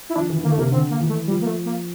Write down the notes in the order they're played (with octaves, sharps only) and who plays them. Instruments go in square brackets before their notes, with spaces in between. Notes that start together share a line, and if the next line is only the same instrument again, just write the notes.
[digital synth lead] E4
[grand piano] F3 [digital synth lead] D4
[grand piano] E3
D3
[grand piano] E3 [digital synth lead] A#3
[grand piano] D3 [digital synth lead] A3
[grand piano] C3 [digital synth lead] A#3
[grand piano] D3 [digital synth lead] C4
[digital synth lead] A#3
[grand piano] E3
[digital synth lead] A3
[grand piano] F3 [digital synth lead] G3
[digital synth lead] A#3
A3
A#3